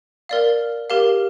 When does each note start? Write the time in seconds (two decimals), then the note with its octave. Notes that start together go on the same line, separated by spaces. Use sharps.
0.29 A#4 D5 F5
0.90 G4 A#4 F5